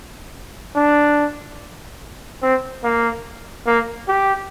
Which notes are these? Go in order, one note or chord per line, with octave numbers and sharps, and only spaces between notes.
D4
C4
A#3
A#3
G4